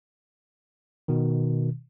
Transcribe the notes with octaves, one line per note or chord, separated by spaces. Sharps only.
B2 D#3